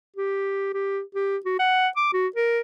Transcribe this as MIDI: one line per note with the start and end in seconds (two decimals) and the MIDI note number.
0.16 0.69 67
0.73 1.01 67
1.15 1.37 67
1.45 1.54 66
1.59 1.88 78
1.97 2.10 86
2.13 2.27 66
2.36 2.60 70